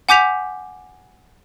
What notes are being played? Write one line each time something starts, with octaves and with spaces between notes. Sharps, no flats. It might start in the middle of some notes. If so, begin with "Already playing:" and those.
F#5 G#5 D6 G6 B6 F7